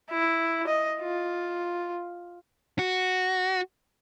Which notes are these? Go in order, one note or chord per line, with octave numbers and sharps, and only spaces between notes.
E4
D#5
F4
F#4